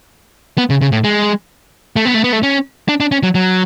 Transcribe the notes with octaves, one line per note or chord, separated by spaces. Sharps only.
B3
C#3
C#3
A2
G#3
A3
B3
A3
B3
A3
C#4
D4
D4
C#4
F#3
F#3